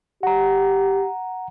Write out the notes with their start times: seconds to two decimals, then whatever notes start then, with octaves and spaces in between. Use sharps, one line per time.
0.23 G4 F#5 A#5